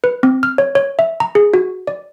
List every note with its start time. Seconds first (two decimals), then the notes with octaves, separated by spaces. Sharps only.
0.04 B4
0.23 C4
0.43 F6
0.58 C#5
0.75 C#5
0.99 E5
1.20 A#5
1.35 G#4
1.54 F#4
1.87 D5